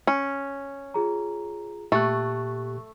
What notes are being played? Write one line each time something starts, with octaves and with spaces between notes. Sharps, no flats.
C#4
F4 G#4 A#5
A#2 A3 G4 C#6 F#6